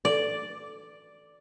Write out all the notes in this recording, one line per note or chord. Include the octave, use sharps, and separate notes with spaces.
D5